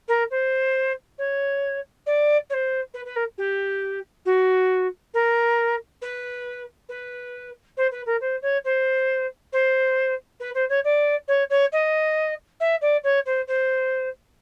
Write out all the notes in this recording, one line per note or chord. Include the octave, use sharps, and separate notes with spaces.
A#4
C5
C#5
D5
C#5
C5
B4
B4
A#4
G4
F#4
A#4
B4
B4
C5
B4
A#4
C5
C#5
C5
C5
B4
C5
C#5
D5
C#5
C#5
D#5
E5
D5
C#5
C5
C5